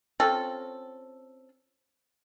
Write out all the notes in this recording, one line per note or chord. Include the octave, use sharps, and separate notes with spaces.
C4 C#4 F4 A4